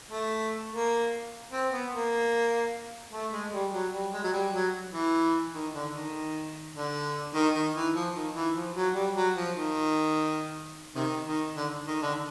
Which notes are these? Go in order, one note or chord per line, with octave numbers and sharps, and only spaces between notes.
A3
A#3
C4
B3
A#3
A3
G#3
G3
F#3
G3
G#3
F#3
G3
F#3
E3
D#3
D3
D#3
D3
D#3
D#3
E3
F3
D#3
E3
F3
F#3
G3
F#3
F3
D#3
C3 D#3
D#3
D3
D#3
D3